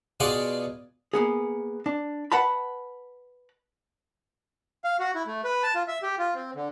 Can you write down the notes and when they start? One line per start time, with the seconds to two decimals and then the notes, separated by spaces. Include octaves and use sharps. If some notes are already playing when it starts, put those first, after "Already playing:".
0.20 B2 F4 G#4 D5 F#5 C6
1.13 A#3 B3 G#4
1.86 D4
2.32 B4 F#5 A5 B5
4.84 F5
5.00 F#4
5.15 E4
5.26 A3
5.44 B4
5.63 A5
5.75 F4
5.88 E5
6.02 G4
6.18 F4
6.35 C4
6.55 D3